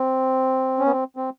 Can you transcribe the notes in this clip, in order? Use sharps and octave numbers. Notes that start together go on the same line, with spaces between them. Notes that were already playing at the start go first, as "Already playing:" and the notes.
Already playing: C4
C#4
B3
C4
C4